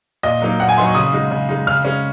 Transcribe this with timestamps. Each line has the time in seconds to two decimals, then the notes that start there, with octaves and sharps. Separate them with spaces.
0.23 A#2 D#5
0.42 F#3 A#3 D#4
0.60 A#2 F#5
0.69 G#5
0.78 F#3 A#3 D#4 C6
0.86 C#6
0.95 C#3 D#6
1.13 G#3 D#4
1.31 C#3
1.49 G#3 D#4
1.67 C#3 F6
1.85 G#3 C#4